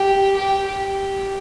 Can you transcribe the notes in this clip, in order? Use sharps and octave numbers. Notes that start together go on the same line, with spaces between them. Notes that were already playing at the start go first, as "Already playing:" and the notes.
Already playing: G4
G4
G4